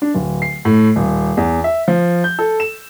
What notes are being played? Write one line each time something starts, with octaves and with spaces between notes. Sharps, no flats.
D4
D1
C7
A2
D#1
E2
E5
F3
G6
A4
E7